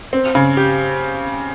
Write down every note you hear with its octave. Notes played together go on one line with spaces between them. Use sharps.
C4
C#3
G4